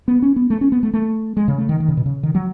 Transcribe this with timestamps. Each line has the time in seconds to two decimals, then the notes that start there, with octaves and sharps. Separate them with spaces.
0.08 B3
0.22 C#4
0.36 B3
0.50 A3
0.61 C#4
0.72 B3
0.83 A3
0.94 A3
1.37 G#3
1.48 C#3
1.58 A3
1.69 D#3
1.80 D#3
1.89 C#3
1.97 B2
2.06 C#3
2.23 D#3
2.35 F#3